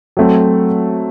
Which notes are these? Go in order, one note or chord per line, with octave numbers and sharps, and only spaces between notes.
F#3 A3 C4